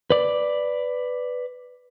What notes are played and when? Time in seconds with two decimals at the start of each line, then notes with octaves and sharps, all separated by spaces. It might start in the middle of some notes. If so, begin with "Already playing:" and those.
0.10 B4 D5